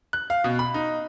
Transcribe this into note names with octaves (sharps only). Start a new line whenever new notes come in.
F#6
F5
B2
B5
D#4